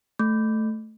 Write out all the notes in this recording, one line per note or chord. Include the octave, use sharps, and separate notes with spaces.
A3